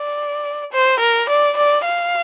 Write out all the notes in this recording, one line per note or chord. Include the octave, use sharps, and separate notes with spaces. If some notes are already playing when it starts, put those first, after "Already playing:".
Already playing: D5
C5
A#4
D5
D5
F5